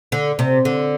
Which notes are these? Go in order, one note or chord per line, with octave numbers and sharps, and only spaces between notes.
D3
C3
D3